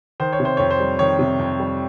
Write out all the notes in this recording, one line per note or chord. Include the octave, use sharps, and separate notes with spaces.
D#3 C5
C#5
C3
C5
F2 C#5
C5
G3
D#3 C#5
C3
F2
G3